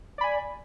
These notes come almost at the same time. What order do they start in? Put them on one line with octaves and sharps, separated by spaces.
D5 B5 G#5